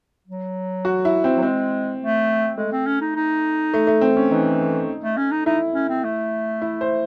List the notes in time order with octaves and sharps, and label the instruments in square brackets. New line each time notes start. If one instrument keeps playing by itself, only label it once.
[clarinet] F#3
[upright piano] F#4
E4
C4
[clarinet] F#3
[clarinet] G#3 [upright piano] C4
[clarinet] A3
[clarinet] G#3 [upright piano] A3
[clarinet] C4
C#4
D#4
D#4
[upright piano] A3
A3
C4
C#4
[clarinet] E3 [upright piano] D#4
[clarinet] A3
C#4
D#4
[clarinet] D#4 [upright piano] E4
[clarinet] C#4
C4
A3
[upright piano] E4
C5